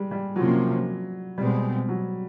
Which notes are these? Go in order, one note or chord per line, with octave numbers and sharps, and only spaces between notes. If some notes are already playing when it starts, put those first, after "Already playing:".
Already playing: G3 G#3
G3
C3 F3 F#3 A#3 C#4
B2 G3 G#3 C4
F#3